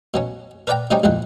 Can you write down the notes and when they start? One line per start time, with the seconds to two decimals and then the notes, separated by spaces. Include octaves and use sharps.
0.14 B2 F#3 C#4
0.67 A#4 B4 D5 F#5 G5 A#5
0.91 C3 F#3 G3 C#4 D#4 G4
1.03 C2 F2 A#2 G#3 F#5